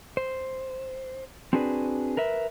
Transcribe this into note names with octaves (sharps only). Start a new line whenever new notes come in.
C5
C4 D4 F#4 G#4 B4 D5
A#4 B4 E5